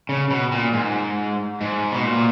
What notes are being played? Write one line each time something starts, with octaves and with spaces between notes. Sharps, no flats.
C#3
B2
A#2
G#2
G#2
B2
A#2